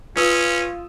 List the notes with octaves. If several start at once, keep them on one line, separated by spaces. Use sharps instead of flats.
C#4 F4 B4 D#6 E6